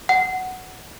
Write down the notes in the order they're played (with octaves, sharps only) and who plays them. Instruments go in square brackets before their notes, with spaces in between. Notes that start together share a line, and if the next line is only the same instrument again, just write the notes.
[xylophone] F#5